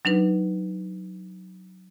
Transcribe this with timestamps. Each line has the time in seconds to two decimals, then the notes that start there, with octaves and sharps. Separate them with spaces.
0.05 F#3 D4 D#4 B4